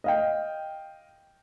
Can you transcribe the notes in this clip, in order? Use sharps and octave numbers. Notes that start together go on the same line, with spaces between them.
D#5 F5 G5